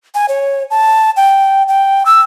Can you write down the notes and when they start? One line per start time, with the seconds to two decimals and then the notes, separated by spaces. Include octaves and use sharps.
0.15 G#5
0.29 C#5
0.71 A5
1.17 G5
1.68 G5
2.06 E6